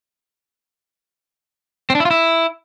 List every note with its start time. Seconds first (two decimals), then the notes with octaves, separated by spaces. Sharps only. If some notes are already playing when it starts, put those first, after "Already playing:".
1.90 C4
1.95 D4
2.00 E4
2.05 F4
2.11 E4